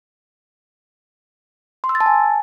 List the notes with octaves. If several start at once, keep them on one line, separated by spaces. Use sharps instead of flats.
C6
E6
A6
A5
G#5